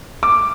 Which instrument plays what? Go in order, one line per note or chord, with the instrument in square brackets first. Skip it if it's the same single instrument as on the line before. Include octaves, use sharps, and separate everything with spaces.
[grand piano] D6